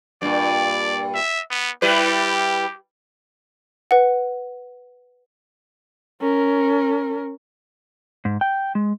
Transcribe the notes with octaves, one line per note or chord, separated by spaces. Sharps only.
G2 A#2 D5
E5
B3
G3 E4 G4 B4
B4 F#5
C#4 A#4
G#2
G5
G#3